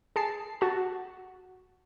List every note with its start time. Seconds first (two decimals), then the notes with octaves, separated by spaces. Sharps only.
0.16 G#4 A5 C7
0.61 F#4 A5